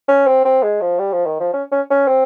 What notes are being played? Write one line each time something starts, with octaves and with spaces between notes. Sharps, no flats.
C#4
C4
C4
G#3
F3
G3
F3
D#3
F3
C#4
C#4
C#4
C4